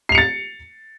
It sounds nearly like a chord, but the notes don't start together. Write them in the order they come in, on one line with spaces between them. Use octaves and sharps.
C7 F7 C#7 A6